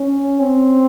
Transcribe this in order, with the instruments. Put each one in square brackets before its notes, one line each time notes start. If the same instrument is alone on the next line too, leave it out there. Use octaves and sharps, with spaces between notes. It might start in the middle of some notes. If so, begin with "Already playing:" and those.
Already playing: [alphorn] C#4
C4